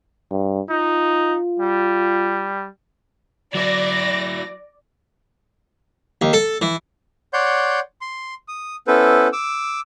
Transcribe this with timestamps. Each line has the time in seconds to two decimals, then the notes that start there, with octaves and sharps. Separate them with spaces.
0.31 G2
0.70 D#4 F4
1.60 G3
3.55 F#3 E4 D5 A#6
6.22 D#2
6.33 A4
6.62 E3
7.33 C#5 D5 F#5 C6 G6
8.01 C6
8.48 D#6
8.88 B3 C#4 E4 A4 B4 C5
9.33 D6 E6